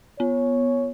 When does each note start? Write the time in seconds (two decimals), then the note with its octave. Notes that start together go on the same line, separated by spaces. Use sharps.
0.20 B3 C#5